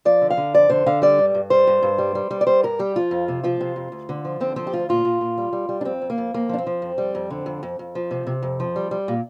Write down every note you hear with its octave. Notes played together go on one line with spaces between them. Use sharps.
F3 D5
D3
F5
D3
F2 D5
D3 C5
D3 F5
G3 D5
G2
G2
G3 C5
G2
G2
G3
G3
G3
D5
G3 C5
G2 A#4
G3 G4
F3 F4
F2
C3
F3 F4
C3
F2
D2
D3
F3
D3 C4
F3 C4
G4
D2 F4
A#2 F4
A#2
A#2
G3
G3
G3
D4
F2 C4
F2
A#3
F2
F2 A#3
F3 D4
C4
F3
F2
G3
F2
D3
F2
F2
F2
F3
C3
C3
F2
F3
G3
G3
A#2